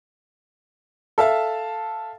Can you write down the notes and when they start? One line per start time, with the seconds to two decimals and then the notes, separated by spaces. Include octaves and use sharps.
1.18 A4 E5 F5 A5